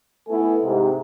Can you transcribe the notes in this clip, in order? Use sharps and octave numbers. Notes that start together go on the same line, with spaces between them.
A3 B3 E4 A4 G#5
G#2 C3